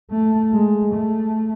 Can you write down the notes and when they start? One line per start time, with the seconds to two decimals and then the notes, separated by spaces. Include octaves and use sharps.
0.11 A3
0.52 G#3
0.94 A3